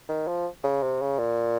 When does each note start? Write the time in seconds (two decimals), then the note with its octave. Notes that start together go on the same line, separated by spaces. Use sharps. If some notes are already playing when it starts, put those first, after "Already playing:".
0.09 D#3
0.27 F3
0.64 C#3
0.82 C3
1.02 C#3
1.19 A#2